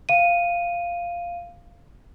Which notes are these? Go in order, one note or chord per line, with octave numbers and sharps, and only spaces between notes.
F5 D#7